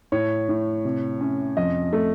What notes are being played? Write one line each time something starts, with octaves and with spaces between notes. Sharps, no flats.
A2 C#5
A2
C3
C#4
F2 D#5
A3